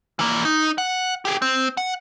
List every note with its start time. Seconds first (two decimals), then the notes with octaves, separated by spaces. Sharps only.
0.19 E3 A#3
0.45 D#4
0.78 F#5
1.25 G4 G#4
1.42 C4
1.77 F#5